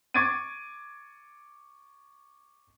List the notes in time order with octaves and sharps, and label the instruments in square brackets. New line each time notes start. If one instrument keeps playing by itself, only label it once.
[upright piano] C#6 D6 G#6 A6 D7 D#7